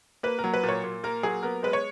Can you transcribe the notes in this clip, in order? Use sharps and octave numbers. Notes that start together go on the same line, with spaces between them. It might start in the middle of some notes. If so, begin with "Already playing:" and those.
A#3 B4
A#4
F#3
B4
A#2
C#5
A#2
A#3 A#4
F#3 G#4
B3 A#4
G#3 B4
C#5